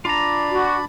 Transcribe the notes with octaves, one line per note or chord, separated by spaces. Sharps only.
D4 F4 D5 A#5 B5
F#4